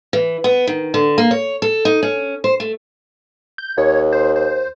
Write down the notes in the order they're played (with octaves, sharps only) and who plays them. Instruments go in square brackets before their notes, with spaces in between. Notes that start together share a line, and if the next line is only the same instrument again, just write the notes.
[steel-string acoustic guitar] E3
B3
D#3
D3
A#3
C#5
A4
D#4
C#4
C5
A3
[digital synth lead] G6
[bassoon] D#2 [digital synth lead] C#5
[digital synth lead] C5
C5